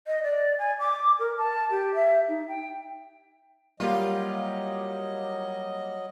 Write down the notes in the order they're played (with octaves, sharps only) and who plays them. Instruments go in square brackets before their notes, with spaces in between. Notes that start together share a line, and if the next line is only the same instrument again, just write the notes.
[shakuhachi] D#5
D5
G#5
D6
A#4
A5
G4
E5
D#4
G5
[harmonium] F#3 D#5 [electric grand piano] G3 A#3 G4 [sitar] F4